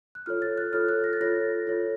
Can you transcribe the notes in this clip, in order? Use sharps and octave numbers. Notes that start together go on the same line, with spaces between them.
F#6
F4 A4 C#5 F6
A6
F#6
F4 A4 C#5 F6
F#6
A#6
A6
F4 A4 C#5 A#6
F4 A4 C#5